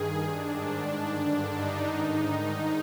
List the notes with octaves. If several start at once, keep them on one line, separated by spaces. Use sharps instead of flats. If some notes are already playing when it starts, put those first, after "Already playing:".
Already playing: G2 D#3 G#4
G#2 D#3 D4
G2 D3
D#4
G#2 D#3